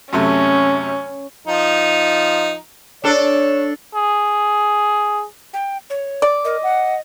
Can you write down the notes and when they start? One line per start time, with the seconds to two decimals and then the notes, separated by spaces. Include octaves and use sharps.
0.13 F#2 C3 A3 C#4
1.48 F3 D#4
3.04 D4 A4 C#5
3.95 G#4
5.54 G5
5.90 C#5
6.22 D5
6.45 A#4 D#5
6.63 F#5